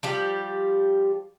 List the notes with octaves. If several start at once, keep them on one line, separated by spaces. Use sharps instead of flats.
F3 G3 G4